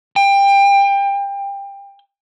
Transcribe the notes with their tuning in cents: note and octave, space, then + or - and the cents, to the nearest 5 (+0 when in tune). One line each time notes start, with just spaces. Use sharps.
G5 +25